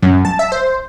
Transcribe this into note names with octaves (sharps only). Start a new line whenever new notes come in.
F#2
A5
E5
C5